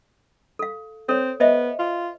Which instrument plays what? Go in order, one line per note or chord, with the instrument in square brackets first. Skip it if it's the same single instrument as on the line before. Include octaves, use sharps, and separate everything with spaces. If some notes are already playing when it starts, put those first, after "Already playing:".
[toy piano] A4 F5
[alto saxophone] C4 [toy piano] A4 C#5
[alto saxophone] B3 [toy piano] C5 D#5 E5
[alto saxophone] F4